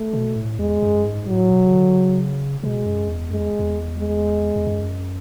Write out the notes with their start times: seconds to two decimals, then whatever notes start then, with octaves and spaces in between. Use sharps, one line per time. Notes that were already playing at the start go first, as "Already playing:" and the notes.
Already playing: A3
0.13 B2
0.36 A2
0.58 E2 G#3
0.82 F#2
1.05 G#2
1.27 A2 F#3
1.50 B2
1.67 C#3
1.72 D3
1.96 C#3
2.63 B2 G#3
2.86 F#2
3.08 E2
3.30 F#2 G#3
3.40 E2
3.59 E2
3.98 G#3
4.56 E2
4.67 F#2